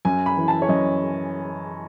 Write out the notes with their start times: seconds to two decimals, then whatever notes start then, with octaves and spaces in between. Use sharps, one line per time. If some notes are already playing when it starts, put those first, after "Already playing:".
0.05 F#2 G#5
0.26 B5
0.37 E3
0.48 A5
0.62 C#5
0.69 F#2 D#5